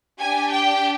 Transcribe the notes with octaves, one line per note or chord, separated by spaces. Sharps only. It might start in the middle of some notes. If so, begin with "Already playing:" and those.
D4 G4 G#5
G5